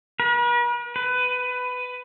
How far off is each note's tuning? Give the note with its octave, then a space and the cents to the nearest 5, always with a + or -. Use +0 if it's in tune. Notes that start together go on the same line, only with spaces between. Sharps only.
B4 -45
B4 +15